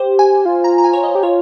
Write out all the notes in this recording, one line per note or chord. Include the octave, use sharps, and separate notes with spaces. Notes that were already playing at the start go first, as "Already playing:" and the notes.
Already playing: G4 C5
G#5
F4
A#5
A#5
G#5
C#5
D#5
G4
F4 C#5